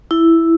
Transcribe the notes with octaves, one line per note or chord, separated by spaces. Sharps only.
E4